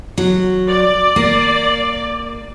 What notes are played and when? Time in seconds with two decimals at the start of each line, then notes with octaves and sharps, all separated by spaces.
0.18 F#3
0.68 D5
1.16 A#3